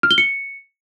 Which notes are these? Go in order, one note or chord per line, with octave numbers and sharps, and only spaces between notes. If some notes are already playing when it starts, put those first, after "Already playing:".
F6
G7
C#7